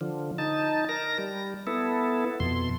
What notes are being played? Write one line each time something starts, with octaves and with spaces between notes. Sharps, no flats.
D3 F3
D#4 A5
A#4 A#6
G3
B3 E4 A4
F2 B2 C6